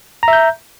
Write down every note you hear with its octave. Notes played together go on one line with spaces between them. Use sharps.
E5 A#5 G6